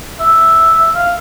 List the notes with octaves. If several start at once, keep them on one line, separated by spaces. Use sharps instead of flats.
E5
F5